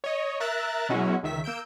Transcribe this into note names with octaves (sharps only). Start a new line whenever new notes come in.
C#5 D#5
A#4 E5 A#5 F#6 A6
B2 F#3 G#3 C#4 E4 F#4
C#2 D#3 E5 B6
A#3 E6 G6 D7